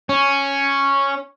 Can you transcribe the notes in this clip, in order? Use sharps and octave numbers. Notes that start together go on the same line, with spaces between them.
C#4